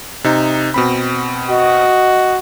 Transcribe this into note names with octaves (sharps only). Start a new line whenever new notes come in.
C3 D#4
B2 C4 B5
F#4 D#5